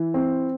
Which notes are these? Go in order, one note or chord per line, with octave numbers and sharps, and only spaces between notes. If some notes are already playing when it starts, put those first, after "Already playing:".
Already playing: E3
C4